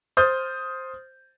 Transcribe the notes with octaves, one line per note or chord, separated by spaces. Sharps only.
C5 D#6 F6 G6 A6